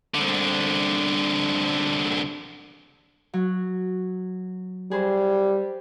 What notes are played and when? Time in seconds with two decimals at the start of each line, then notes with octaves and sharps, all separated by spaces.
0.15 C2 D3
3.33 F#3
4.91 G3 G#4 B4 C5